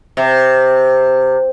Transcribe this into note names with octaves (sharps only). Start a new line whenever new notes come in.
C3